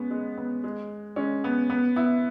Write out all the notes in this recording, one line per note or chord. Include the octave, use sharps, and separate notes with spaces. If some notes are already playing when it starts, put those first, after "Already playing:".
Already playing: G#3 B3 C#4
G#3
B3
G#3
G#3 C#4
B3
B3
B3 E4